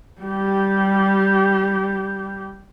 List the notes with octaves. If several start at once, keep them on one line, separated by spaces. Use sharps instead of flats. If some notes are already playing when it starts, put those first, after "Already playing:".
G3 G4